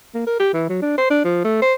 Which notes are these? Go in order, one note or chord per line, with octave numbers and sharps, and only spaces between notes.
A#3
A#4
G4
E3
F#3
D4
C5
D4
F3
A3
C5